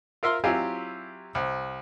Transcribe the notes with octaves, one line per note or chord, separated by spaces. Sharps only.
F4 A#4 E5 F5 C6
F#3 C4 E4 F4 G4 G#5
C2